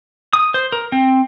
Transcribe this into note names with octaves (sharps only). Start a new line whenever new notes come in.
D#6
C5
A#4
C4